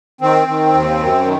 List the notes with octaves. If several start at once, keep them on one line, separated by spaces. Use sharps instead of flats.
D#3 C4
D#3
D#2
F#2
D#3